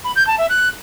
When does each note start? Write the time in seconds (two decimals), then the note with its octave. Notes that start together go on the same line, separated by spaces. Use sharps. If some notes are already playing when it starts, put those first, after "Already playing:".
0.04 B5
0.16 G6
0.27 A5
0.38 E5
0.49 F#6